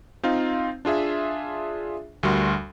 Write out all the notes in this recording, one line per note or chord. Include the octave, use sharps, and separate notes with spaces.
C4 D#4 F4 F5
D4 F4 G#4 E5
D2 G3 F#4 A#4 C6